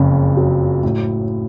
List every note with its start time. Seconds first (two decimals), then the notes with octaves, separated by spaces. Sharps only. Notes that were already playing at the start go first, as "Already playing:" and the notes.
Already playing: F#1 F2 C#3
0.37 F#3
0.83 A2